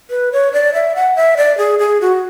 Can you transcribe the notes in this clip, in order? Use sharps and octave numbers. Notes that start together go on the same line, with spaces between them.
B4
C#5
D5
E5
F#5
E5
D5
G#4
G#4
F#4